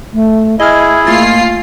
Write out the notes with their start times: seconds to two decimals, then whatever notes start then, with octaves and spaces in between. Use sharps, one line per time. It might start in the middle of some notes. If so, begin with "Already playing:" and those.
0.13 A3
0.60 E4 G#4 D#5 E5 F6
1.07 A3 A#3 F4 A6 C7